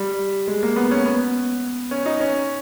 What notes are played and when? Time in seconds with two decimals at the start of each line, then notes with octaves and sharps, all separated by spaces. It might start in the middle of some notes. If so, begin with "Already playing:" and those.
Already playing: G3
0.47 G#3
0.63 A#3
0.76 B3
0.91 C#4
1.06 B3
1.91 C#4
2.06 D#4
2.21 C#4